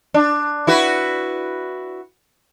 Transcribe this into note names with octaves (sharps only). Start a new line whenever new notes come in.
D4
E4 F#4 B4